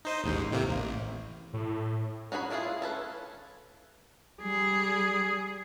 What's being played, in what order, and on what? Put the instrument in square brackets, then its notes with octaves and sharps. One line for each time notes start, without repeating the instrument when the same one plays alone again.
[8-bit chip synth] D#4 C5 D#5
A1 D#2 G#2
A2 C3 A#3
A1
[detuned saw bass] A2
[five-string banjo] C#4 F#4 G#4 C5 B5
A3 D4 E4 F4 G#4
C#4 A4 B4
[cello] G3 G#4